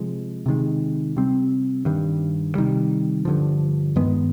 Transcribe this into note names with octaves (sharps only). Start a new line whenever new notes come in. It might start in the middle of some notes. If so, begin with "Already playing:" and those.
Already playing: C3 F3 G#3
C3 D#3 G#3
C3 G3 C4
G2 D#3 G3
C3 D#3 G3
G2 D3 F3
G2 D#3 G#3 B3